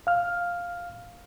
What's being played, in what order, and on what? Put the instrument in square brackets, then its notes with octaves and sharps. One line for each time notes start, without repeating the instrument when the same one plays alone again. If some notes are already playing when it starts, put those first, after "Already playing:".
[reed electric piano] F5 F6